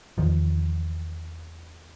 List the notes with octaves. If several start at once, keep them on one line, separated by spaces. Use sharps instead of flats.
E2 D#3 F3